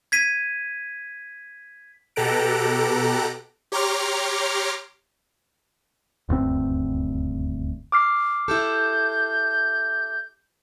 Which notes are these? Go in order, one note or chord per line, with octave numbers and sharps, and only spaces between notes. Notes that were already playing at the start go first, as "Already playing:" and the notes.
G#6 B6 D#7
B2 G4 A4 A#5 F#6 D7
G4 C#5 A#5 C6 D6 F6
D#1 D2 G2 C4
D6 F6 C7
E4 G4 A4 G6